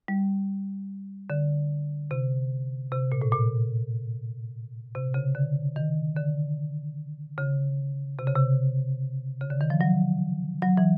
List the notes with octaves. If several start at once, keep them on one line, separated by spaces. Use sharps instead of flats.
G3
D3
C3
C3
A#2
A2
A#2
C3
C#3
D3
D#3
D3
C#3
C3
C#3
C3
C#3
D3
D#3
F3
F#3
F#3
E3